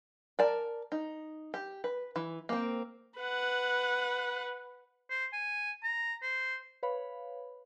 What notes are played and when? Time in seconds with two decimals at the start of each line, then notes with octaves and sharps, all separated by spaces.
0.39 A#4 D5 A5
0.92 D#4
1.54 G4
1.84 B4
2.16 E3
2.49 A#3 C4
3.18 B4 F#5
5.10 C5
5.33 G#5
5.83 A#5
6.22 C5
6.83 B4 C#5 F5 B5